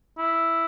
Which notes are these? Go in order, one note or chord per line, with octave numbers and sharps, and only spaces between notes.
E4